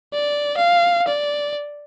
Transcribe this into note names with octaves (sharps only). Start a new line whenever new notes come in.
D5
F5
D5